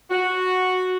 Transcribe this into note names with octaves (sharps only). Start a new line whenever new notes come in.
F#4